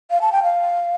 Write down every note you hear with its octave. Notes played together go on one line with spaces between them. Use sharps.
F5
A5
G5
F5